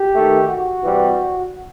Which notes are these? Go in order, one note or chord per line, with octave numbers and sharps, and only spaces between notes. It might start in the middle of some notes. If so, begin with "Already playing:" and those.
Already playing: G4
D#3 A3
F#4
C3 E3 G3